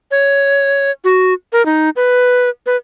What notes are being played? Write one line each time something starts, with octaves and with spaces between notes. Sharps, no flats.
C#5
F#4
A#4
D#4
B4
B4